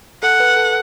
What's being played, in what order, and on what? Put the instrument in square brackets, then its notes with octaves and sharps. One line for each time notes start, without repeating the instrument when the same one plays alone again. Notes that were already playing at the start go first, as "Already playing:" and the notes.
[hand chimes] A4 [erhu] F#5
[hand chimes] B4
A4